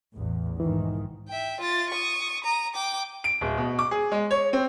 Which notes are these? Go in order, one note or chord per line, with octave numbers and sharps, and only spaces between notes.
A1 E2
B1 G#2 D#3 E3
E5 G5
F4 A6
C#6 D#6
A#5 D#6
G5 D6
D7
D1
B2
D6
G#4
G#3
C#5
C4